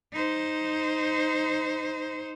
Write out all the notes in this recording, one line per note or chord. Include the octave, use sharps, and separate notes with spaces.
D#4 C5